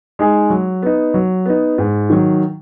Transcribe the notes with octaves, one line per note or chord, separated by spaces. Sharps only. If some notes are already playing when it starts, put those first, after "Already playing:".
G#3 D#4 G#4
F#3
B3 D#4
F#3
B3 D#4
G#2
D#3 F#3